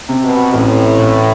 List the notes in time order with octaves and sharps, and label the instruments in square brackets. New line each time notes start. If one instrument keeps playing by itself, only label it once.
[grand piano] C3
[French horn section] B2
[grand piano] A1 [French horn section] A2
[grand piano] A1